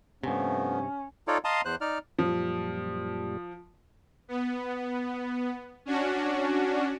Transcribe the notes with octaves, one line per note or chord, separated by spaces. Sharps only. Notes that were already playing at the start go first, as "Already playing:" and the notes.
G2 C3 F3 A3 B3 C#4
D#4 F4 A4 C#5 D5
D#5 F5 A5 A#5 C6 D#6
E2 C5 F#6
D#4 D5 F6
F#2 A#2 F3 G3
B3
C#4 D4 F#4